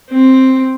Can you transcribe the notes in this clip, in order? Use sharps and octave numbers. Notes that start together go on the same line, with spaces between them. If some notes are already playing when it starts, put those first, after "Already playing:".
C4